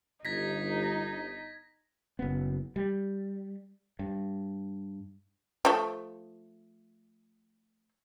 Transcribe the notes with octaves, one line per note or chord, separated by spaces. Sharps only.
G1 D#4 G#6 A#6 B6
F#1 B3
G3
G2
F3 A3